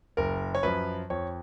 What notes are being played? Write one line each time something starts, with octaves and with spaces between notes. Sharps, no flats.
F#1 A#4
C#5
F#2 F3 B4
F2 C#5